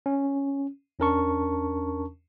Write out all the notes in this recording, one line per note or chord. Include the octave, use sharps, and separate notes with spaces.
C#4
E2 C#4 D4 A#4 A5 C#6